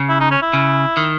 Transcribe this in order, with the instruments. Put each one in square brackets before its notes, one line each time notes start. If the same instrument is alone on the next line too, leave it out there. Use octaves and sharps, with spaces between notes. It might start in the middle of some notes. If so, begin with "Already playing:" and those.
Already playing: [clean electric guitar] C#3
[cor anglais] E4
D#4
C#4
E4
[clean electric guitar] C#3
D#3